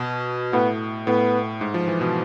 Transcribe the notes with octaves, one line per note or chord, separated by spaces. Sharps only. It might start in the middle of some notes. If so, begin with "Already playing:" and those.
Already playing: B2
A2 B3
A2 B3
G#2
F3
E3
B2